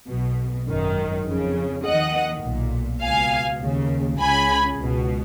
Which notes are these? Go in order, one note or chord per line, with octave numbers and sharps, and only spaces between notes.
B1 B2
G#1 F#2 D#3
F2 C#3
D#2 D#3 D#5 F#5
B1 A#2
C#2 B2 F5 G#5
D#2 C#3
C#2 C#3 G#5 B5
C#2 B2